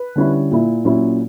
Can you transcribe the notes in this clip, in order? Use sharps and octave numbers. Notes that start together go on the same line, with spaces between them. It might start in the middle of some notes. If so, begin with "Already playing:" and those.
Already playing: B4
D3 G3 C#4 E4
A#2 A#3 E4
A#2 F#3 C#4 E4